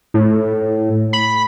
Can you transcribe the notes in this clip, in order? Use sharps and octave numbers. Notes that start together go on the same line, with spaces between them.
A2
B5